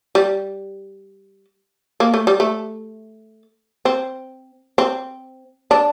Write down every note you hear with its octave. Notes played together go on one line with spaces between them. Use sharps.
G3
A#3
A3
G3
A3
C4
C4
D4